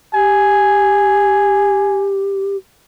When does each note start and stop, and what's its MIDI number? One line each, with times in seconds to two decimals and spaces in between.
0.14 2.56 67
0.14 2.09 80